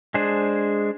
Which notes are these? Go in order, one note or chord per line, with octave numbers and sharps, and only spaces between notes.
G#3 D4 G#4 C5